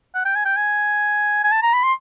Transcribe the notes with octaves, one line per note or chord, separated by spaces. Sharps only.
F#5
G5
G#5
G5
G#5
G#5
A5
A#5
B5
C6